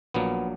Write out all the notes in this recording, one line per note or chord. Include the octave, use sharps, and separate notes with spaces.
A#1 A#2 F#3 A#3 B3